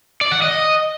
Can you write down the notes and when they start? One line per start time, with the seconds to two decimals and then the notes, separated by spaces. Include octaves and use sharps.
0.21 D5
0.32 F#5
0.42 D#5